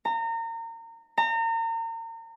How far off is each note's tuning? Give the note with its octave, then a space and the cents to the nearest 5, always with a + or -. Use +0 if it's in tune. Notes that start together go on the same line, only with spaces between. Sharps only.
A#5 -30
A#5 -35